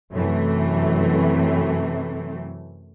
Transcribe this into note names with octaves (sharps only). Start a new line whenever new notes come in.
F#2 C3 E3 A3